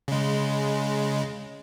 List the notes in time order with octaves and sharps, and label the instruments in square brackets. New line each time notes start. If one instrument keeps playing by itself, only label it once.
[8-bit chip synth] C#3 G#3